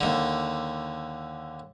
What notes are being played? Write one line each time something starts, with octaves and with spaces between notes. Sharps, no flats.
D#2 D3